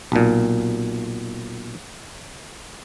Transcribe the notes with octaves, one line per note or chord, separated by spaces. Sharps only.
B1 A#2